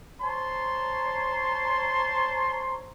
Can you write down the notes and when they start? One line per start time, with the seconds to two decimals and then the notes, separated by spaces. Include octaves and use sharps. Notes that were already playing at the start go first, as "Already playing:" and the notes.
0.21 C5 C#5 A5 A#5 C6